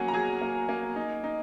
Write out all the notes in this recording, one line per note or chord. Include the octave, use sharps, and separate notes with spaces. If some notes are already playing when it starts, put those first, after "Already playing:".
Already playing: F#3 A#3 C#4 F#4 G#4 F#5 G#5
A#5
F#3 G#4 G#5
A#3
A#3
D#4
D#4